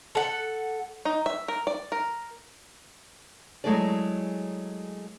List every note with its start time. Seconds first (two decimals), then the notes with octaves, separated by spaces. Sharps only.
0.15 A4 F#5
1.05 D#4
1.26 E5
1.48 A#4
1.67 D5
1.92 A#4
3.64 F#3 G#3 A3 E4 G#4 D5